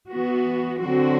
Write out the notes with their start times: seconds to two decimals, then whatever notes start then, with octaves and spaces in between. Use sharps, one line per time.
0.11 E3 B3 F#4
0.82 D3 F#3 C4 F#4